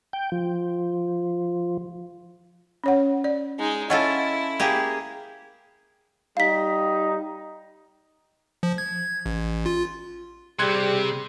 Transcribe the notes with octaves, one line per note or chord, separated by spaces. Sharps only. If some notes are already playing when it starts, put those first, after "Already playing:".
G5
F3
C#4 C#5 F#5
D5
G#3 D#4
C#4 E4 F4 A4 D#5 F#5
A#3 G4 G#4
G3 D#4 F5 B6
F3
G#6
A1
F4
C3 G3 C4 G#4 C6 F#6 G#6